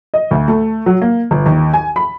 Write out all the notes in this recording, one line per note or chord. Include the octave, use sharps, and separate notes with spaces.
D#5
D2
A3
F#3
A#3
G1
D#2
G#5
B5